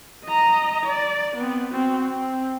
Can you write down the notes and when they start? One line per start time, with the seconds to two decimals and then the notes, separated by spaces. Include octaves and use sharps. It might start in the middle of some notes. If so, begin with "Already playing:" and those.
0.25 D#5 A#5
0.85 D5
1.36 B3 C4
1.71 C4 F#4
2.09 C4